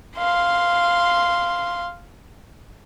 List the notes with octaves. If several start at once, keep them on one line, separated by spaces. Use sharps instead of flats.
F5 C6